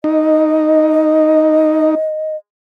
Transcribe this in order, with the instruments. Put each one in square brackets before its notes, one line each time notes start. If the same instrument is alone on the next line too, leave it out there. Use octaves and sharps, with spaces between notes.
[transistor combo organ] D#4 [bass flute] D#5